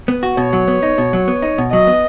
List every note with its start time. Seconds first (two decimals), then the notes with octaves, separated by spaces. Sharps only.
0.08 B3
0.23 F#4
0.37 B2 C#5
0.53 F#3
0.68 B3
0.83 D#4
0.98 B2
1.13 F#3
1.28 B3
1.42 D#4
1.58 B2
1.72 F#3 D#5
1.87 B3